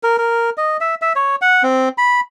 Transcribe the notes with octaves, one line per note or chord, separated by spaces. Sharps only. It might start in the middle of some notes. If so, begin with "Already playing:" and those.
A#4
A#4
D#5
E5
E5
C#5
F#5
C4
B5